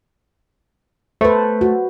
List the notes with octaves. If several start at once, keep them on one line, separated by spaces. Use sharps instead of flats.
A3 B4 C5
F#4